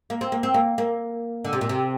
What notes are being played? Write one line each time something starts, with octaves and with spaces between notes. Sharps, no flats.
A#3
C4
A#3
C4
A#3
A#3
D3
C3
A#2
C3